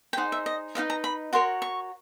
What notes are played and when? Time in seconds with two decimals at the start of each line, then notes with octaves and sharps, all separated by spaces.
0.13 G5
0.17 D#4 G#4 C5 D#5 F#5
0.32 E5
0.46 D#5
0.75 D#4 F#4 B4 D#5 F5
0.90 A#5
1.04 B5
1.33 F#4 A#4 C#5 C6
1.62 C#6